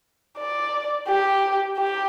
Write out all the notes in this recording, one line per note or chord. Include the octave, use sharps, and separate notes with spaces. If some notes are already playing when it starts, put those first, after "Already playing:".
D5
G4
G4